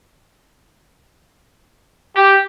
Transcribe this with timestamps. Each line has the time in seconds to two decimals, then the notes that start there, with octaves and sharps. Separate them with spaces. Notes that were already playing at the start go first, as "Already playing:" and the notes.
2.16 G4